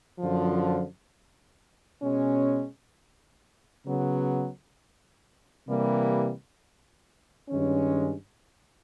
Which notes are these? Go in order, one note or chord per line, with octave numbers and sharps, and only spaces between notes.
F#2 D3 F3
B2 G#3 C#4
C#3 F#3 B3
C3 E3 G3 A#3
G2 D#3 G#3 C#4